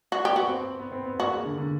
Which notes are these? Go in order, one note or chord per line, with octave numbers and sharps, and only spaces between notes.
F#4
G4
B3 F#4
C4
B3
C4
B3
A#3 F#4
G#3
D3
D3